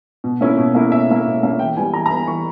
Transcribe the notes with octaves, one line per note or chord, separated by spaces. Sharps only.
B2
A#3 C#4 E4
B2
A#3 C#4 E4
B2 E5
A#3 C#4 E4
B2
A#3 C#4 E4
E3 G5
G3 B3 E4 G#5
E3 A#5
A#5
G3 B3 E4 B5
E3 C#6